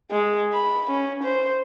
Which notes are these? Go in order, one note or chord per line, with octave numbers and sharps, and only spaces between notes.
G#3
B5
C#4
C5